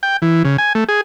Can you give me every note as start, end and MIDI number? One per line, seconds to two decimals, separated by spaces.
0.03 0.17 79
0.22 0.43 52
0.45 0.57 49
0.58 0.73 80
0.75 0.84 57
0.89 1.01 68